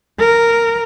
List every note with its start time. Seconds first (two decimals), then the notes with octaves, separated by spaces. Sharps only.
0.19 A#4